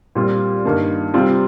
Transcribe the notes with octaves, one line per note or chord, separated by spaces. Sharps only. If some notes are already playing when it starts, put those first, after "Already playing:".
A#2 G3 C4 F4
G2 D#3 A#3
C3 G3 C4 F4